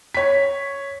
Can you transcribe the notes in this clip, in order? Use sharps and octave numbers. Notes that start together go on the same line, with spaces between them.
C#5 B6